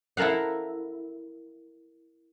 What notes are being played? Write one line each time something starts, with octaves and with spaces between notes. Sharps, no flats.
E4 A4 A#4 F5 F#5